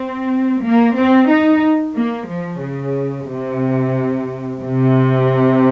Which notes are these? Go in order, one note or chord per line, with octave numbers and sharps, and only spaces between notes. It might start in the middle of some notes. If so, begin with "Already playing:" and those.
Already playing: C4
A#3
C4
D#4
A#3
F3
C#3
C3
C3